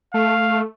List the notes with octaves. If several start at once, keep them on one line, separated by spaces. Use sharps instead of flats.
A3 F5